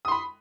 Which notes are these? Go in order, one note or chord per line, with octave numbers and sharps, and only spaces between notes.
B5 C6 D#6